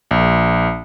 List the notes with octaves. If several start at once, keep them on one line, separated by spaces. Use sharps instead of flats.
A#1